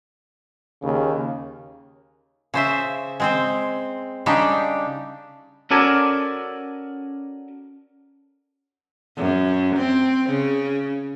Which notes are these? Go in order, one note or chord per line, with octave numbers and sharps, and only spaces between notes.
D#2 C#3
C#3 C5 E5
G#3 C4 C5
C#3 G3 D4 D#4 G4
C#4 F#4 A4 A#4 D5 G#5
F#2
C4
C#3